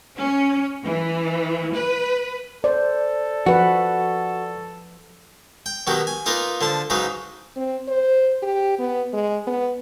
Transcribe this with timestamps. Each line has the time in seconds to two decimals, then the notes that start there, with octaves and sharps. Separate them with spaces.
0.17 C#4
0.85 E3
1.74 B4
2.64 A4 C5 D5
3.46 F3 F#4 B4
5.66 G5
5.87 B2 D#3 F#3 B3 G4
6.07 G#5
6.26 A#3 D#4 F4 A#4 B4
6.61 D3 F3 A5
6.90 G#2 C#3 F#3 D#4 B4
7.56 C4
7.88 C5
8.43 G4
8.79 B3
9.13 G#3
9.47 B3